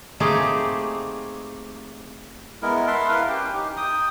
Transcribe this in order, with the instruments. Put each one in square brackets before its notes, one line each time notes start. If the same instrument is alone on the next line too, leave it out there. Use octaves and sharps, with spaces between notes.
[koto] A3 A#3 C4 D#4 G4 G#4
[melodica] G#3 B3 E4 A#4
E5 F#5 A5 C6
E4 A#4 B4 F5
C#4 G4 G5
D#4 G4
G5 D#6